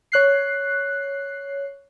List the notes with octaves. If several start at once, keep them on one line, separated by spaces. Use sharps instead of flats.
C#5 F#6 C7